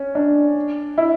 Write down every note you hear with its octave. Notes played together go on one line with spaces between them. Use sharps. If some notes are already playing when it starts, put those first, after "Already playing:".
Already playing: C#4
D4
E4